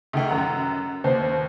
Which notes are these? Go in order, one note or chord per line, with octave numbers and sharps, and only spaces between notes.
D2 D#3 G5
F#2 F#5 A#5
D#2 C5